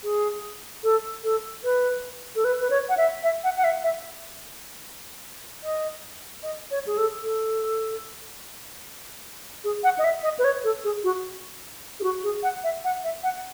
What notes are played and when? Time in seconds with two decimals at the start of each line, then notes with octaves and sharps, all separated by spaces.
0.04 G#4
0.84 A4
1.23 A4
1.64 B4
2.36 A4
2.44 B4
2.60 B4
2.70 C#5
2.89 F#5
2.97 E5
3.23 E5
3.44 F#5
3.57 F#5
3.64 E5
3.84 E5
5.64 D#5
6.43 D#5
6.71 C#5
6.87 G#4
6.98 A4
7.23 A4
9.64 G#4
9.84 F#5
9.98 D#5
10.04 E5
10.23 D#5
10.39 B4
10.44 C#5
10.64 A4
10.84 G#4
11.04 F#4
12.00 G#4
12.03 F#4
12.24 G#4
12.43 F#5
12.64 E5
12.84 F#5
13.04 E5
13.23 F#5